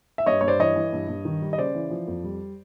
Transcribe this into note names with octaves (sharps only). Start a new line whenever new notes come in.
E5
G2 C#5 D#5
G2 C#5
C5 D5
E3 C#5 D#5
E3
G2
G2
D#3
G3
D#5
C#3 C5 D5
E3
F3
F2
G3